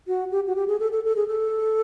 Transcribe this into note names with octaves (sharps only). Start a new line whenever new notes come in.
F#4
G4
F#4
G4
G#4
A4
A4
A4
G#4
A4